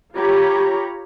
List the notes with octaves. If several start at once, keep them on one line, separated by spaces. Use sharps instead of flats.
F4 G4 C#5 A#5 B5